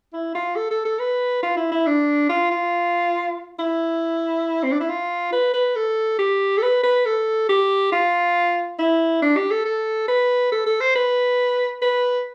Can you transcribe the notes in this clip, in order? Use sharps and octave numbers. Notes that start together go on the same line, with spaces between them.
E4
F4
A4
A4
A4
B4
F4
E4
E4
D4
F4
F4
E4
C4
D4
E4
F4
B4
B4
A4
G4
A4
B4
B4
A4
G4
F4
E4
D4
G4
A4
A4
B4
A4
A4
C5
B4
B4